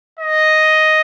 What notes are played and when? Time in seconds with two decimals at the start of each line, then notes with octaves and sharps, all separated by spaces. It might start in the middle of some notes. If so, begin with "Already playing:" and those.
0.19 D#5